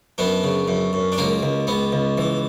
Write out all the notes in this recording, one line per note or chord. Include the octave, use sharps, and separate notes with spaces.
F#2 B3 D4
C#3
F#2
F#2
D4
C#2 A#3 C#4
C#2
C#2 B3
C#2
E3